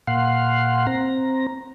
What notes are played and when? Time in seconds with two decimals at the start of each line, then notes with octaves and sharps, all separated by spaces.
0.07 A#2 F5 F#5 C6
0.87 C4 A#5